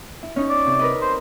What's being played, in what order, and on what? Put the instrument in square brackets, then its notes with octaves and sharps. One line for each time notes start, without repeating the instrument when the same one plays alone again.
[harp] E4
C#4 D#4 C#6
[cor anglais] D5
[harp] C3
A#4 B4 D#5
[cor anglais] C5